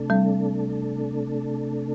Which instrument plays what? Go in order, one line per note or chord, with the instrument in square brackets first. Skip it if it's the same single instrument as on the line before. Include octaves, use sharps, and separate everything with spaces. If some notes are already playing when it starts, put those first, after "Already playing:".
Already playing: [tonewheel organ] C3 A3 D4 A4
[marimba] G3 C4